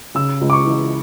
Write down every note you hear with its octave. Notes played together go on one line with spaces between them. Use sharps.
C#3 E6
C#2
D6
C#6
E3